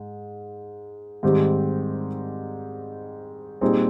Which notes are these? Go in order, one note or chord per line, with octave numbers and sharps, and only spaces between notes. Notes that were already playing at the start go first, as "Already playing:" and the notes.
Already playing: G#2
G#2 D#3 G3 C4 G4
A#2 G3 C4 D#4 G#4